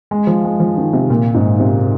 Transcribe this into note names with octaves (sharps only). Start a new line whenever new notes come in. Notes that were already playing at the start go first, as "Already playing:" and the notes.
G#3
F3
G#3
F3
D#3
C3
A#2
G#2
C3